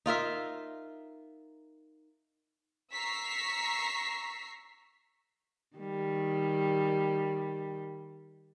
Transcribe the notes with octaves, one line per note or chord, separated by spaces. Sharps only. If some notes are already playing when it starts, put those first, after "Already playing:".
D#4 F4 A#4 E5
A#5 C#6 E6 B6 C7
D#3 G3